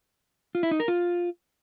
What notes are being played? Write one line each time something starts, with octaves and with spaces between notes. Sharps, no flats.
F4
E4
D#4
A#4
F4